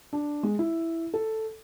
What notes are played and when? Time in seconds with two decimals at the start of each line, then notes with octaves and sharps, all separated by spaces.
0.13 D4
0.43 G#3
0.59 E4
1.14 A4